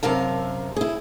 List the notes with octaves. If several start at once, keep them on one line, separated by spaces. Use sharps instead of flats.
F#2 C3 A#4 F5 A5
E4 G#4